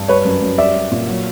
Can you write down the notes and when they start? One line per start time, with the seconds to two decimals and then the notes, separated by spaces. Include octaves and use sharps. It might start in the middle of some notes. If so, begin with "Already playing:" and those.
Already playing: G2
0.08 G3 B4 C#5
0.25 F#2
0.42 F#2
0.58 G3 D5 E5
0.74 G3
0.92 A#2
1.07 F#3